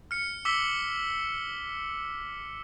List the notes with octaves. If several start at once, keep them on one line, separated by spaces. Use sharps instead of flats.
F6 C#7
D6 E6 B6 G7